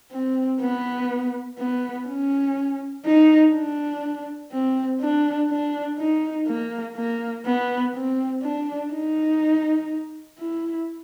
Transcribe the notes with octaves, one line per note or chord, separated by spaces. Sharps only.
C4
B3
B3
C#4
D#4
D4
C4
D4
D4
D#4
A#3
A#3
B3
C4
D4
D#4
E4